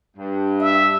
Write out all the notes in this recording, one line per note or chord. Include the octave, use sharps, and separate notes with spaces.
G2
E5